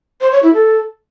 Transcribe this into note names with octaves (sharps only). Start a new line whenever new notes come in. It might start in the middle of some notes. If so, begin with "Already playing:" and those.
C5
C#5
E4
A4